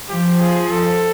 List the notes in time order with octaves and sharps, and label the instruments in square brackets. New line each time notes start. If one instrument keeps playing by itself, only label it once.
[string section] F3 [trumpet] G4
[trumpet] G#4
A4